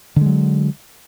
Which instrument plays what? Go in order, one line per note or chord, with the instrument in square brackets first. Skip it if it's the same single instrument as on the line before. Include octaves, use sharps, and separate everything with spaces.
[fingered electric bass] D3
G#3
F#3